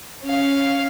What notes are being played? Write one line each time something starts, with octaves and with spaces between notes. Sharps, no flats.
C#4 F5